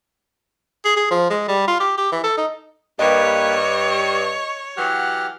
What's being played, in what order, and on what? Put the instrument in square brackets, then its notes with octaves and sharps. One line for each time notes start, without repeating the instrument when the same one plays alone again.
[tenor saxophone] G#4
G#4
F3
G#3
G3
F4
G4
G4
E3
A4
D#4
[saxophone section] G2 [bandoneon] A#3 G4 B4 [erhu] C#5 [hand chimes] D#5
[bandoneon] C#6
[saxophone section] E3 F#3 F#5 [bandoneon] G4 F6